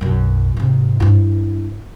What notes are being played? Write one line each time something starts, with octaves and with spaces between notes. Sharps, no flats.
B1 F#2
G#2 C3
G2 E4